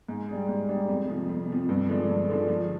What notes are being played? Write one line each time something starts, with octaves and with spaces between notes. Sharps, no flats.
G#2
G3 D4 G#4
G#2
G3 D4 G#4
F2
C3 F3
F2
C3 F3
G2
D3 F3 G#3 D4
G2
D3 F3 G#3 D4
F3